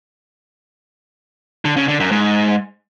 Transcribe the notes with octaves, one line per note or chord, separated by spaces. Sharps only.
D3
C#3
D3
F#2
G#2